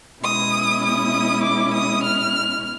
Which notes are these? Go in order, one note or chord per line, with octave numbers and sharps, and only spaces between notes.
B2 G#3 C#4 E4 D#6
D#6
D6
D#6
F6